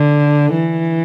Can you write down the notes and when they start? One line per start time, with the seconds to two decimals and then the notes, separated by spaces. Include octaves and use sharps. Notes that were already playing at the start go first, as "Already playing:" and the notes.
Already playing: D3
0.54 E3